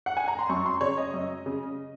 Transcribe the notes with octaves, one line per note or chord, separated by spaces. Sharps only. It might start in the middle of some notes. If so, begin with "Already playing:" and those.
F#5
G#5
A#5
C6
F#2 C#6
C6
C#3 C#5
D#5
F#2
C#3